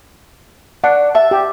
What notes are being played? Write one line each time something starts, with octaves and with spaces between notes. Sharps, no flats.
D4 F#5
E5 A5
G4